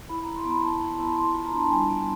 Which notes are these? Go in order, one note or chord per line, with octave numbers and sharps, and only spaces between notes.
E4 B5
E4 A#5
C6
B3
B5
B3 A5
E4
E4
B3 C6
F4 B5
A#5
D4 A5
G3 G#5
B3